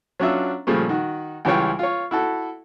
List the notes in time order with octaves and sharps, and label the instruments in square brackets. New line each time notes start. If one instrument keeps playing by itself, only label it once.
[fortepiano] F#3 C#4 D4 F4 E5
A#2 C#3 F3 G3 A3
D#3 F#4
C#2 E3 G3 F4 C#5 G5
F4 C#5
E4 F#4 A4